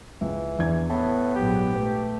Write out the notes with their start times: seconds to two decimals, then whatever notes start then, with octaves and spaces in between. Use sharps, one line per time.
0.21 C#2 E3
0.59 E2 D4 G#6
0.90 A2 B3 A5
1.36 A#1 G#2 F#3 G4
1.75 A3 B4